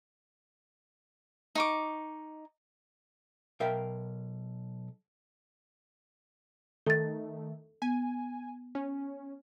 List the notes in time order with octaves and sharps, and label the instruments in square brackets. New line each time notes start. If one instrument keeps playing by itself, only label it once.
[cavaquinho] D#4 C#6 D6
[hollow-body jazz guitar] B1 A#4 E5 F5 G5
[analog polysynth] D#3 A3 [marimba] A4 A6
[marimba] B3 [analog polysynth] G#5
[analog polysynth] C#4